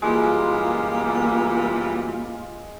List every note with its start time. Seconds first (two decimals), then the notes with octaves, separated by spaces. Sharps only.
0.02 F#2 E3 G3 G#3 A#3 F4